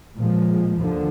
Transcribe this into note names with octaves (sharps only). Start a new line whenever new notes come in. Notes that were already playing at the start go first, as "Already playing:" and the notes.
A#2 F3 G#3
D#2 D3 F3